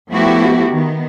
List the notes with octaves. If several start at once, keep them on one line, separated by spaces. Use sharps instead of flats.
F3 A3 B3 E4 F#4 G4
D#3 B3